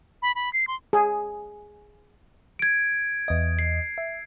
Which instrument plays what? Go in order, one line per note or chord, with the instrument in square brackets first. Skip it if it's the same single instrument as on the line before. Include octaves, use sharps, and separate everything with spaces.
[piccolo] B5
B5
C7
C6
[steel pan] G#4
[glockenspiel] G#6 D7
[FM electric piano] E2 D#5
[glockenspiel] C7
[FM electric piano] E5